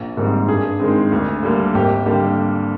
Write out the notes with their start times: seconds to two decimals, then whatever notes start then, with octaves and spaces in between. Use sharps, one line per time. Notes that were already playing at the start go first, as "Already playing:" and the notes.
Already playing: A#1
0.17 G#2 D#3 G3 C4
0.48 G2 G#4
0.80 D#3 G#3 C4
1.12 D2
1.43 D3 G3 A#3
1.75 G#1 G4
2.06 D3 G3 A#3 G4